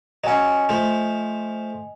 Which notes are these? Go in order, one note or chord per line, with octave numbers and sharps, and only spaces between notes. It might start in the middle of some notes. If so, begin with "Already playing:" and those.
F#3 C#4 D#5 G#5
F3 A3